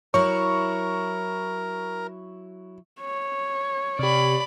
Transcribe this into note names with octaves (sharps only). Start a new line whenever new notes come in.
F#3 E4 A#4 C#5 C#6
C#5
C3 G4 D5 B5